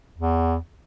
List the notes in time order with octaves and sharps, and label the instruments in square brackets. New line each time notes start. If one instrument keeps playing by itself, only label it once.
[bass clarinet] E2